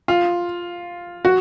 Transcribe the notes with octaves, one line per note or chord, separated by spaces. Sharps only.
F4
F#4